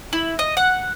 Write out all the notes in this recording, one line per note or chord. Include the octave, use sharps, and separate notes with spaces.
E4
D#5
F#5